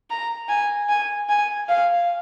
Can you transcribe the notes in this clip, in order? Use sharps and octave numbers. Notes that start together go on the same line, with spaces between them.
A#5
G#5
G#5
G#5
F5